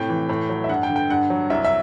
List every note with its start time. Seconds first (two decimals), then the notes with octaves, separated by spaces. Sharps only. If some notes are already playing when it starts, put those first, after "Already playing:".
Already playing: A2 C3 G5
0.09 E3
0.29 A2
0.49 F#3
0.64 E5
0.69 G2 F#5
0.83 G5
0.90 D3
0.96 G5
1.10 G2 F#5
1.30 F#3
1.50 C2 E5
1.64 E5